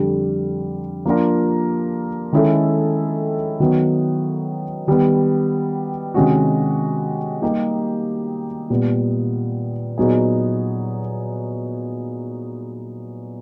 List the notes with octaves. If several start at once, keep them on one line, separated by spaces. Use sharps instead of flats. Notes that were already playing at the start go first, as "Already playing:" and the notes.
Already playing: F2 D3 G3
F3 A#3 D4 F4 A#4
D#3 G#3 C#4 E4 A4
D#3 F#3 B3
D#3 G3 B3
C3 D#3 G#3 C#4 F#4
G3 A#3 D#4 G4
A#2 G3 B3
A#2 F#3 B3 D#4 G#4